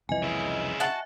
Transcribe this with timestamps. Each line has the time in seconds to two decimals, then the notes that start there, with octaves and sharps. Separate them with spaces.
0.09 C2 F2 E3 D#5 G#5
0.23 C#3 E4
0.80 F#4 E5 F#5 A5